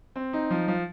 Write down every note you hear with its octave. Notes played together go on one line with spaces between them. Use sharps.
C4
D#4
F3
F3